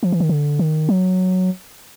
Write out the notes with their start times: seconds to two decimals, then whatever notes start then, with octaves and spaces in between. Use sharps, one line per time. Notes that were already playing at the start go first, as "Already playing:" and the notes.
0.03 F3
0.12 E3
0.20 D#3
0.29 D3
0.59 D#3
0.89 F#3